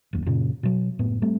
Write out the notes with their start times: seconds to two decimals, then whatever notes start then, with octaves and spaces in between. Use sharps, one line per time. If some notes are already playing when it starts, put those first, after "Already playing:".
0.13 F#1 D#2
0.26 F#2 A#2 C#3
0.63 B2 F#3
0.99 F#1 A2 B3
1.22 G3 A3 C4